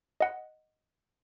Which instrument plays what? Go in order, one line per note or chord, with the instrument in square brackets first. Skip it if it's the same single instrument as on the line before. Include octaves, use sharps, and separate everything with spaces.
[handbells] D#5 F#5